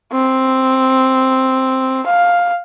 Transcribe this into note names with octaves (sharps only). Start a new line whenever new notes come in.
C4
F5